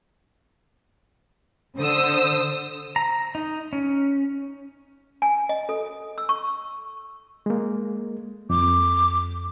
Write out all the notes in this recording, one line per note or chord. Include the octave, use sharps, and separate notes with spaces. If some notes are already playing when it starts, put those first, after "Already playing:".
D3 C5 D#6 E6
A#5
D#4
C#4
G#5
D#5
A4
E6
C#6
G#3 A#3
F2 D6